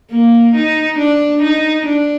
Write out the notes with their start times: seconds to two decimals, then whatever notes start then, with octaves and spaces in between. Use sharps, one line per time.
0.11 A#3
0.55 D#4
0.99 D4
1.42 D#4
1.86 D4